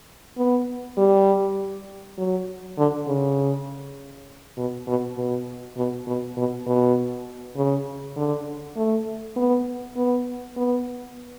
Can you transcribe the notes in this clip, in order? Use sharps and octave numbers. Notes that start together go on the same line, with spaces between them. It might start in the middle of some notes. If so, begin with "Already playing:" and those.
B3
G3
F#3
D3
C#3
B2
B2
B2
B2
B2
B2
B2
C#3
D3
A3
B3
B3
B3